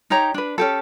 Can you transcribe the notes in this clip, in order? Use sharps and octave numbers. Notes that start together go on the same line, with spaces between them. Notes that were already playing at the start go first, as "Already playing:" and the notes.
D#4 G4 C#5 A#5
D4 B4
C#4 G4 A4